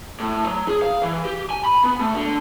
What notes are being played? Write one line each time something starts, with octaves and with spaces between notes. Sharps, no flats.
A2
F#3
G#4
F5
E3
G4
G#5
B5
B3
A3
D3